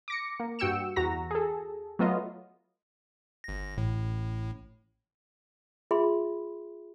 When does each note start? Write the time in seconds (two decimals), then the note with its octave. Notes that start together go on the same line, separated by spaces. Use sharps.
0.08 D6 A#6 C#7
0.40 A#3
0.59 G2 F#4 G5 E6 C#7 E7
0.96 E2 F#4 A#5 A#6
1.31 G#4 A4
1.99 F#3 A3 B3 F4 D#5
3.44 G1 A#6
3.78 A1 A2
5.91 F4 G#4 E5 B5 C6